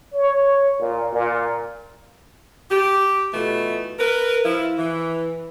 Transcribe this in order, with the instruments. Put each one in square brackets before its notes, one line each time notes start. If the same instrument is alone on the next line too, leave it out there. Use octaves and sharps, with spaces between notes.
[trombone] C#5
A#2
A#2
[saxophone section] G4
B2 E3 A3 F4 A4
A#4 B4
F3 E4
E3